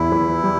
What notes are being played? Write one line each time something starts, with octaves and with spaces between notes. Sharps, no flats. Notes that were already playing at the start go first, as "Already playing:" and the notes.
Already playing: E2 E3 E4
E3
G3